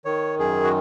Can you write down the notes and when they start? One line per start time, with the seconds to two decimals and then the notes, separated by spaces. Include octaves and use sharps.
0.05 D#3 C#5
0.39 F#2 G#4
0.64 F#4